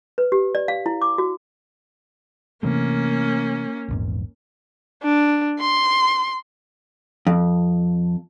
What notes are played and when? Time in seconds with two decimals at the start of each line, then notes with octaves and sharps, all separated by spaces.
0.18 B4
0.32 G4
0.55 D5
0.68 F5
0.86 E4
1.02 D6
1.18 F#4
2.63 C3 E3 A3 A#3 C#4
3.88 A#1 E2 G#2
5.03 D4
5.60 C6
7.27 F2